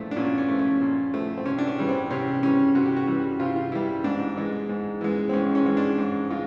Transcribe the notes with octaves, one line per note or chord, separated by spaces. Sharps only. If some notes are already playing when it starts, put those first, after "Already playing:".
Already playing: A#2 F3 A3
D4
A#2 C#4
C#4
F3 A3
C#4
A#2
F3 A3
C4
C3 C#4
D4
C#4
E3 G3
C4
C3 C#4
E3 G3 C#4
C3 F#4
G4
F#4
E3 G3
C3 F4
F4
E3 G3 E4
G#2 D4
E3 G#3
G#2
E3 G#3
C4
G#2 C#4
C#4
E3 G#3 C#4
D4
G#2
G#3 F4